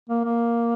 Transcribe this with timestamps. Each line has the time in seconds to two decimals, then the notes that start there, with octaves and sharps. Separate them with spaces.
0.10 A#3
0.25 A#3